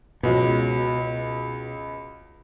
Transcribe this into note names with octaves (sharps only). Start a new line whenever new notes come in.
C#2 B2 F#3